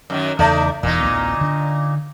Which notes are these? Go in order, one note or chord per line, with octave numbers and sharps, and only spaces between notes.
F#2 D#3
E2 C#3 A3 D#4 D5
E1 E2 A#2 D#4
A1 D2 B3
D3 D4